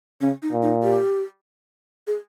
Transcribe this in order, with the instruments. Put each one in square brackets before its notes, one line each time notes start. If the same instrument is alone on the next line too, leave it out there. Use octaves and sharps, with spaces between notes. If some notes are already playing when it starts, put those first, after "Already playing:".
[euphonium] C#3 [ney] C#4
[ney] D#4
[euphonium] A#2
[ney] D#4
G4
G#4